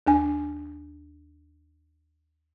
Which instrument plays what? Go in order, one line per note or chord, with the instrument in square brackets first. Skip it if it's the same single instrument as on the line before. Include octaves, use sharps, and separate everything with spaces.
[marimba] D#2 D4 G#5